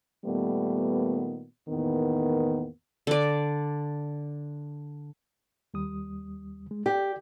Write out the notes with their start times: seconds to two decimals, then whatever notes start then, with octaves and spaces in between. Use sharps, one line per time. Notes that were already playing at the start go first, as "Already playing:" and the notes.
0.25 A#2 D#3 G3 A3 B3
1.69 E2 A2 D#3 A#3 B3
3.07 D3 D5
5.74 D#2 G3 D#6
6.71 G#3
6.86 G4 D5 G6